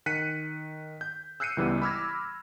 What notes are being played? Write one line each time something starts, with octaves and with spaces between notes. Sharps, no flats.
D#3 F#6 B6 C#7 D#7
G6
E6 F#6 G6 C7 C#7 D#7
C#2 E3 G3 B3
B5 D6 E6 F6 G#6 A#6